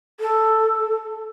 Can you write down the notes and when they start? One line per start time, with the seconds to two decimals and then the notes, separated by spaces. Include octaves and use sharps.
0.20 A4